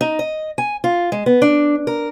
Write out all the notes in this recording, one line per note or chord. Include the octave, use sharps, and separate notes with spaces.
D#4
D#5
G#5
F4
G#3
B3
D4
A#4